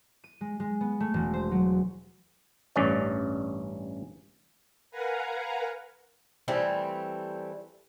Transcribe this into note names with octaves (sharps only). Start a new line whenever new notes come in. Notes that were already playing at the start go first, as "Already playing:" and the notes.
D#7
G#3
G#3
B3
A3
E1
C5
F#3
A1 G2 C#4 D5
A#4 B4 F5 F#5 G#5 A#5
E3 G3 A3 C4